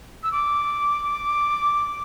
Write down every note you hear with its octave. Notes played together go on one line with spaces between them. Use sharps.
E6
D6